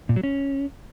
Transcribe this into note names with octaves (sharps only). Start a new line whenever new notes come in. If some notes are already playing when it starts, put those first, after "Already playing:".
A#2
F#3
C#4